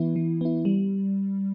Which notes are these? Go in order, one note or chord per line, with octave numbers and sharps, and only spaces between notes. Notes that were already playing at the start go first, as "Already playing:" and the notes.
Already playing: E3 B3 E4
E3
B3 E4
G3